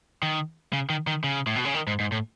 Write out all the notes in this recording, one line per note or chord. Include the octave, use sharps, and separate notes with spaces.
D#3
C#3
D#3
D#3
C#3
A2
B2
C#3
D#3
G#2
G#2
A2